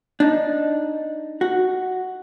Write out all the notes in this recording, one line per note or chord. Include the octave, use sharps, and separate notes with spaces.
D4 D#4
F#4